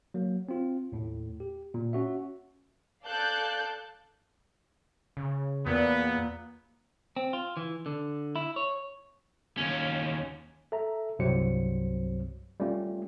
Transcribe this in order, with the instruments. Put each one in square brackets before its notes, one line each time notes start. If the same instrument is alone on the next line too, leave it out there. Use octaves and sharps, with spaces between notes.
[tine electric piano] F#3 A#3
C4 F4
D#2 A2
G4
A#2
C#4 F#4 E5
[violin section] A4 D5 F5 A5 F#6 G6
[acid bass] C#3
[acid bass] E2 [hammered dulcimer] A#2 [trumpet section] B3
[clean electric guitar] C4
F4
E3
D3
E4
C#5
[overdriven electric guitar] D#2 C#4
[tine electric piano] A4 E5 A#5
C2 G2 C3 F#3 C5 C#7
G3 A3 C#4 F4